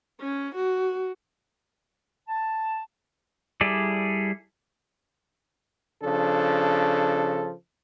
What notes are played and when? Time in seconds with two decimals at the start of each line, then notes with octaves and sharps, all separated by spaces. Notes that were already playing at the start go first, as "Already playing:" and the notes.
0.21 C#4
0.55 F#4
2.28 A5
3.61 G3 E4 G#4 A4 D5
6.03 C#3 F3 D4 A4